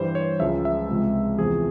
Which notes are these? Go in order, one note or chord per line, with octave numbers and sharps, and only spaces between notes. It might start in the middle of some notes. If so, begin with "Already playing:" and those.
Already playing: G2 E3 G3 C5
C#5
C#2 C#3 F3 G#3 E5
E5
C#2 C3 F3 G#3
E2 C3 F3 G#4